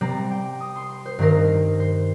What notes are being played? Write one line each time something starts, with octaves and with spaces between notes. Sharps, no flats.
C3 G3 C4 A#5
G5
D#6
C6
C6
C5
G2 D#3 C4 A#4
C5